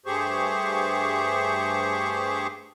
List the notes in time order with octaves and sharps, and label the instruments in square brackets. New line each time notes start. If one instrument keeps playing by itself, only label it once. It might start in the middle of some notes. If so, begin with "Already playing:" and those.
[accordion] G2 A3 G4 G#4 C5 C#6